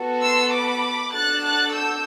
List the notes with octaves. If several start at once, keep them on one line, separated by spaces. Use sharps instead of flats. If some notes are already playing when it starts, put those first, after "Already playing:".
Already playing: B3 F#4 A4
C6 E6
B5 D6
D4 F#4 A4 F#6 A6
F#6 A6
E6 G6